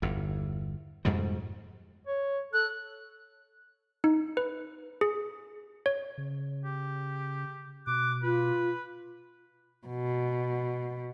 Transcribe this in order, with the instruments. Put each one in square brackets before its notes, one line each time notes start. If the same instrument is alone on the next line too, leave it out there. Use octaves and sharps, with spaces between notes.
[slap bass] G1 E2
F2 G#2 B2 G3
[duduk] C#5
[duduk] A4 [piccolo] F#6
[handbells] D#4
B4
G#4
C#5
[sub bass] C#3
[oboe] G4
[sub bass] B2 [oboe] D6 [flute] F#6
[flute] F4 [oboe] B4
[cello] B2